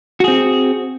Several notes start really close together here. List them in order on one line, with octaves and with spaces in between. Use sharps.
F#4 G#4 C4